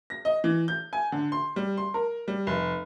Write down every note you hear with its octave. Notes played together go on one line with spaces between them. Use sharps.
A#6
D#5
E3
G6
G#5
D3
C6
G3
C6
A#4
G3
F1